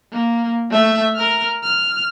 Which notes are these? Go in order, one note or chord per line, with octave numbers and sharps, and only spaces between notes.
A#3
A3 E5
A#4 F6
F6